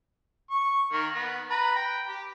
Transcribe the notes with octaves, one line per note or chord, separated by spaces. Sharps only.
C#6
D#3 A#3
B3
B4 A#5 B5
G5
G4